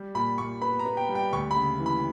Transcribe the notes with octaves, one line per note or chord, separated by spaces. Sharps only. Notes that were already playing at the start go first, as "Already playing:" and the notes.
Already playing: G3
A#2 B5
A#2 C#6
B3 B5
A#5
B3
G5
G3
G5
D2 C#6
B5
C#3
E3
B5